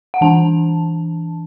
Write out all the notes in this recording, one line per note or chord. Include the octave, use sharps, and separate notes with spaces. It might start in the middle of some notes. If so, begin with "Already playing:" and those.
F#5
E3 D4 A5